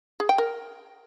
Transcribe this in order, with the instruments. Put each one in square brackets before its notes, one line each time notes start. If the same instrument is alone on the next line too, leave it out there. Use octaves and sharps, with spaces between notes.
[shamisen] G#4
G5
A#4